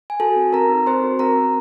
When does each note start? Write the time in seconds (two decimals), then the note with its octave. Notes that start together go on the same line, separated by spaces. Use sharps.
0.10 G#5
0.20 F#4 A4 A5
0.36 C4
0.53 C4 A#4 A#5
0.69 D#4
0.86 C4 C5 C6
1.04 F#4
1.19 C4 A#4 A#5
1.37 C4